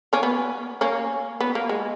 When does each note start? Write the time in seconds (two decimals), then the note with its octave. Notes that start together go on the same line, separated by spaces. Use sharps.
0.13 A#3 C#4
0.23 B3
0.81 A#3 C#4
1.40 B3
1.55 A#3
1.69 G#3